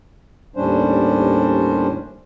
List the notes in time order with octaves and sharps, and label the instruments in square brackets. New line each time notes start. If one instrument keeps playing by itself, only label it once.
[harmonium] D#2 A2 G3 C#4 D4 C5